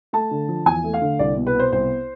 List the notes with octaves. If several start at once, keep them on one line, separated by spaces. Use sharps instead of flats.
A3 A5
D3
F3
E2 G#5
A3
F5
D3
C2 D5
B2
B4
B3 C5
C2 C5